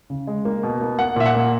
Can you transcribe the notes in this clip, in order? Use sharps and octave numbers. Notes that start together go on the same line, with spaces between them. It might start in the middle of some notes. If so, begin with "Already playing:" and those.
C#3
G#3
A#3
B2
A#3
A#3 F#5
A#2 E5
F#5
A#3